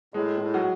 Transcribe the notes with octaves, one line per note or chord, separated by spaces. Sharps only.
A2 G#3
A2
F#3